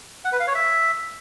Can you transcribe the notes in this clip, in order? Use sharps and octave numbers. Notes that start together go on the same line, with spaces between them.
F#5
B4
F5
C#5
E5